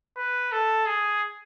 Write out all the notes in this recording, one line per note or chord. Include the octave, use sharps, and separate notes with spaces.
B4
A4
G#4